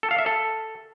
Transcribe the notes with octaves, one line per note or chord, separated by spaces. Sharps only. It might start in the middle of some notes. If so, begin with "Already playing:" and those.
A4
F5
E5
A4